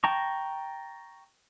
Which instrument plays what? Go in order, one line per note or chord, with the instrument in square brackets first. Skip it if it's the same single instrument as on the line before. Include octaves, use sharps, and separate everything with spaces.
[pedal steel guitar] G5 A5 A#5 C#6